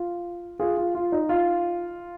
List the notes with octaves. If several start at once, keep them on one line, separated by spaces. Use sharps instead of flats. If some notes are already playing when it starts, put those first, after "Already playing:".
Already playing: F4
F4 G#4
F4
F4
D#4
F4